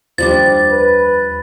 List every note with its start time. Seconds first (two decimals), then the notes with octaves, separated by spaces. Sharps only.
0.18 D#2 F3 G3 D4 A6
0.70 B4